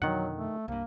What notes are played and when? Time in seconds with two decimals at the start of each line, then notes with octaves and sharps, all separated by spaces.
0.02 F2 B2 D3 D#3 F#3 F#5
0.35 A3
0.68 C2 G2 A#3